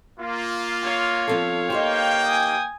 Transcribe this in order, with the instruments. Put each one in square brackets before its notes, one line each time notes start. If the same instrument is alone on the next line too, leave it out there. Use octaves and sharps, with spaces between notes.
[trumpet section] A#3 F4
[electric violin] C#5 F5
[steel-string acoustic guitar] F3 C4 A4
[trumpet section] A#3 G5 [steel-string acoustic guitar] D#4 G4 C5
[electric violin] G#5 D#6